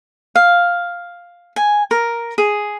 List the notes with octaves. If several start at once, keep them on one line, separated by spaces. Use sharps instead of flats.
F5
G#5
A#4
G#4